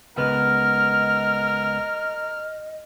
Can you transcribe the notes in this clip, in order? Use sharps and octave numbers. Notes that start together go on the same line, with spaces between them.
C#2 B3 A#4 B4 D#5 F6